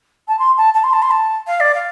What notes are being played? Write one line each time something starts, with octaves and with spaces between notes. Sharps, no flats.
A5
C6
A5
A5
C6
A5
C6
A5
F5
D5
F5